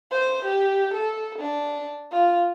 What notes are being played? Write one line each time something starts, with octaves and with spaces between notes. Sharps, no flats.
C5
G4
A4
D4
F4